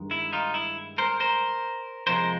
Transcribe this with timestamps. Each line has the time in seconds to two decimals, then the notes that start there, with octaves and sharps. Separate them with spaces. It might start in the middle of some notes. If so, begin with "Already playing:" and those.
Already playing: G2 D#3 G#3
0.11 E4
0.33 D#4 F4
0.54 E4
0.98 A#4 C5
1.20 A#4 C5
2.07 F2 C3 F3 G#3 A#4 C5